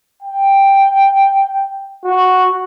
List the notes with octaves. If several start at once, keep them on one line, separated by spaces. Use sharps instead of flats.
G5
F#4